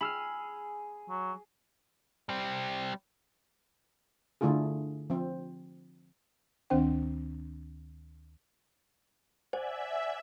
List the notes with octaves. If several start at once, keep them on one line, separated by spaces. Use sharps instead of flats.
G#4 B5 E6 F6
F#3
G3 C4
D3 A3 E4 F4 G#4
F3 C4
D2 D#3 C4 D4 C5 G5
C5 D5 E5 F#5 G#5